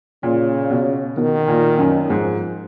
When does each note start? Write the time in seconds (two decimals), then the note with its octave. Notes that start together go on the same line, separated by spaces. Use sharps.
0.23 A#2 C#3
0.71 B2
1.17 B2 D#3
1.48 A#2
1.78 F#2
2.09 G#2 F3